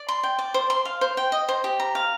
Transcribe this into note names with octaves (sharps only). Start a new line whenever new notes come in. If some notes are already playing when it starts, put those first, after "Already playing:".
Already playing: D5
C6
G5
D5
C5
C6
F5
C5
G5
D#5
C5
G4
A#5
F5